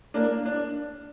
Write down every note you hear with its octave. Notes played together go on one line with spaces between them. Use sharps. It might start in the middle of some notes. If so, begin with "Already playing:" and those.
A#3 D4
D4